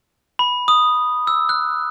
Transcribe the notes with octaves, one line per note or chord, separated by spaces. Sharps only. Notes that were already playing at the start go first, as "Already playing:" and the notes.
B5
D#6
E6
F#6